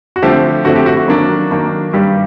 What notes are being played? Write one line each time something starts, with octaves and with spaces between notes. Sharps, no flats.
F#4
D3 F3 A3 C4 G4
D3 F3 A3 C4 F#4
G4
F#4
F#4
D#3 F#3 A#3 D4
D#3 F#3 A#3 D4
G2 D#3 G3 G4